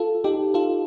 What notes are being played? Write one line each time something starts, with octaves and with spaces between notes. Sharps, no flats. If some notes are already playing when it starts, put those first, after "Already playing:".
Already playing: F4 A4
D#4 G4
F4 A4